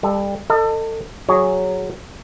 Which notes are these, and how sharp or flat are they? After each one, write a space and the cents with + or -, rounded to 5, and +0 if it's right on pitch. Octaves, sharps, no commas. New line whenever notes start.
G3 +25 A4 +0
A4 +30 D#5 -25
F#3 +0 G#4 +0 C#5 +0